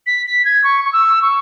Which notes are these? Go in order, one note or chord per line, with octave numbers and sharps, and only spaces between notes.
B6
B6
G#6
C#6
C#6
E6
C#6